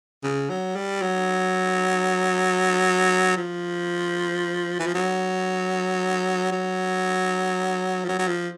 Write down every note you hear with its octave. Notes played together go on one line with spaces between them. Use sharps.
C#3
F#3
G3
F#3
F3
E3
F3
F#3
F#3
F3
F#3
F#3
F3